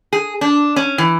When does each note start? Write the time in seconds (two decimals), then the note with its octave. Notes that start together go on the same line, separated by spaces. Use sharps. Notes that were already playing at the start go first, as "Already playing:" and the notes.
0.13 G#4
0.41 D4
0.76 C#4
0.98 E3